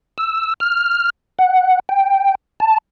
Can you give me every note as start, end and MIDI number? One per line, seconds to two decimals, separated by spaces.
0.18 0.54 88
0.60 1.10 89
1.39 1.80 78
1.89 2.35 79
2.60 2.78 81